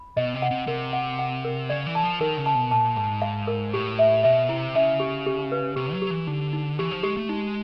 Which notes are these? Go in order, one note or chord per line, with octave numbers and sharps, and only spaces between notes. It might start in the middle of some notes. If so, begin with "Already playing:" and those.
Already playing: B5
B2 D#5
C3
F#5
C3
C3 A#4
F#5
F#5
A#4
C#3 D5
E3
A5
F3
D#3 A#4
C#3
A5
B2
A#2 A5
G#2 A5
F5
A#4
A2 G4
E5
B2 E5
C3 E4
C#3 E5
G4
G4
B4
C3 G4
F#3
G4
E3
D3 D#4
D#4
E3 G4
F3
G#3 G4
A3
G#3 D#4